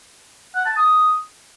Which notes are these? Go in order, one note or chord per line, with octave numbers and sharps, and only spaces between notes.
F#5
A5
D#6